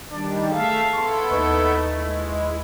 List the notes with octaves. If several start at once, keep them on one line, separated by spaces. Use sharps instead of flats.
D#3 G3 D4
A3 G#4 E5 F5 A5
B3 E4 A4 C6 C#6
D#2 A3 D#4 B4 C#6
G#3 E4